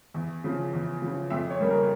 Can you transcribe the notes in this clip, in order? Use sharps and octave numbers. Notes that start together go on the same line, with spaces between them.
E2
C#3 F3
E2
C#3 F3
F2 E5
C#5
C#3 G3 A#3
A#4